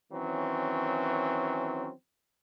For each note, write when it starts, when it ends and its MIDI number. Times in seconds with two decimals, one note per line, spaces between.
0.12 1.92 51
0.12 1.92 52
0.12 1.92 54
0.12 1.92 60
0.12 1.92 61